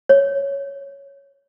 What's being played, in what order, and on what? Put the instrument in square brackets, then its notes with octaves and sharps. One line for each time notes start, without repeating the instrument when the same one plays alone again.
[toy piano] C#5